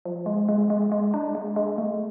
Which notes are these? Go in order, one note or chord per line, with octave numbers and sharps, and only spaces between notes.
F3
G#3
G#3
G#3
G#3
D4
G#3
G#3
A3